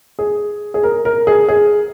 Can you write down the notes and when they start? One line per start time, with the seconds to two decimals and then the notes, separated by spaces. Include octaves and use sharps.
0.19 G#4
0.74 G#4
0.83 A#4
1.05 A#4
1.27 G#4
1.48 G#4